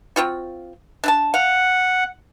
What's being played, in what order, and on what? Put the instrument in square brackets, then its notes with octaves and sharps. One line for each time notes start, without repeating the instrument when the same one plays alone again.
[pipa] C4 F4 F#4
D4 E5 A5
[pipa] F5 [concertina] F#5